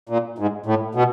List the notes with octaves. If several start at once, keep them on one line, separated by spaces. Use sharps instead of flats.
A#2
G#2
A2
B2